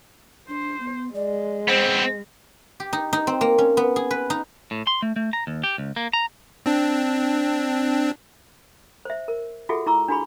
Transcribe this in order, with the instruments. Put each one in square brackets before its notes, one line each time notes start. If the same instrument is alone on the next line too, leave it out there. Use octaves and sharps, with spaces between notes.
[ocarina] D4 [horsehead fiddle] C5
[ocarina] B3
[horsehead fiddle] G#3 [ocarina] D5
[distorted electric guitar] B3 C4 [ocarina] C5
[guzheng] G4
D#4
D#4
C4
A#3
C#4
B3
G#4
B4
D#4
[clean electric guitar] A2
C6
A3
A3
A#5
D#2
G4
C#2
A#3
A#5
[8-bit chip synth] C4 D4
[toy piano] C5 E5
A#4
F4 F#4 G#4 A4 E5 F#5
E4 A#5 C#6 D6 E6
D4 E4 F#4 G#4 B5 C#6